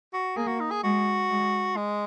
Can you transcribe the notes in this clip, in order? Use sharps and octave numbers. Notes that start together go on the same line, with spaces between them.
F#4
A#3 G#4
F#4
D#4
G#4
G#3 F#4
G#3
G#3